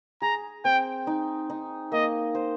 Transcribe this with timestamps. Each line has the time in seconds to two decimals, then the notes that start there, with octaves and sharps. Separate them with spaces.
0.22 G#4 A#5
0.65 C4 G5
1.07 D#4
1.50 D#4
1.92 A#3 D#5
2.35 C5